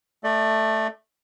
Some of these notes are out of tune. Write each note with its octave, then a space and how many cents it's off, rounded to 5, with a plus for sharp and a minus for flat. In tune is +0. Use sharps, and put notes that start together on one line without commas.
A3 +0 D5 +20